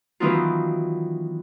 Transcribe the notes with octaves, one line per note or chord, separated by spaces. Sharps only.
D#3 E3 F#3 B3 D#4 F4